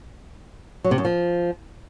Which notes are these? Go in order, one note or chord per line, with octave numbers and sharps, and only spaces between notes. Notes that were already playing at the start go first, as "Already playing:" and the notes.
F#3
C3
F#2
F3